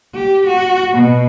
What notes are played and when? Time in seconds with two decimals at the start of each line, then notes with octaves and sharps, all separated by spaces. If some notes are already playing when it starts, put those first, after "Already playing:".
0.15 G4
0.47 F#4
0.93 B2